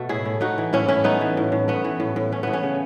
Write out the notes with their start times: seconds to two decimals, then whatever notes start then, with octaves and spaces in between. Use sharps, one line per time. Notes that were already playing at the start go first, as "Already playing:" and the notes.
Already playing: B2 A3 F#4
0.09 A2 E4 G#4
0.25 A2
0.40 A3 D#4 F#4
0.58 E3
0.73 A2 C#4 E4
0.88 A2 C#4 E4
1.04 A3 B3 D#4
1.21 E3
1.37 A2
1.52 A2
1.68 A3 B3
1.84 E3
2.00 A2
2.16 A2
2.32 A3 C#4
2.43 E3 B3
2.53 C#4
2.63 C#3